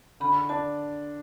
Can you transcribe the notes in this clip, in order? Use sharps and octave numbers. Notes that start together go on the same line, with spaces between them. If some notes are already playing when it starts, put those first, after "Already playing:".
D3 B5
D4 A5